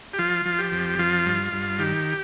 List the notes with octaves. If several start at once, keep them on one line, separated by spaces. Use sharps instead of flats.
G4
F3 F4
F3
G4
F2
F3 F4
G2
G2
D#3 G4